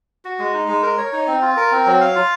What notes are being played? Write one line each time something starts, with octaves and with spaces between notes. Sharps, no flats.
F#4
G#3
D#4
G#3
A#4
C#5
D#4
C4
F4
A#4
C4
F#3
F5
F4